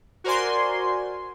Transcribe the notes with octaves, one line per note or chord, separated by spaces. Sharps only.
F#4 A#4 C5 D5 G#5 C6